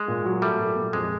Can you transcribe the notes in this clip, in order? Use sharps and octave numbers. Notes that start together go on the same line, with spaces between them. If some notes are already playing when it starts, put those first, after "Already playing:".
Already playing: G#3
A#2
F#3
G3 A3
A#2
A#2
F2 G#3